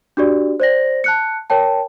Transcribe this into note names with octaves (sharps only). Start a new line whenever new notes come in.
D4 F#4 G4 D5
C5 D5 A#6
A5 F#6 C#7
A#4 C#5 G5 A5